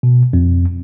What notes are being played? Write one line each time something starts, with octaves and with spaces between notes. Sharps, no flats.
B2
F2